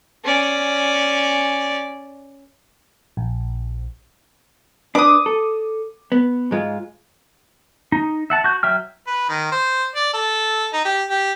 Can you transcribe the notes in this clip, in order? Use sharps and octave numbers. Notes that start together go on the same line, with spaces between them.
C#4 D5
A#1
D4 B4 D6 D#6
A4
B3
G#2 G#3 F4
D#4
E5 F#5 A5
F#4 G6
F#3 E5 G5 F6
B4
D#3
C5
D5
A4
D#4
G4
G4